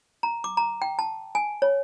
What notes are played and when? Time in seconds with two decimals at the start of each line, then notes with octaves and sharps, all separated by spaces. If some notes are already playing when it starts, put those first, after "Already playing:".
0.23 A#5
0.44 D6
0.57 A#5
0.82 G5
0.99 A5
1.35 G#5
1.62 C#5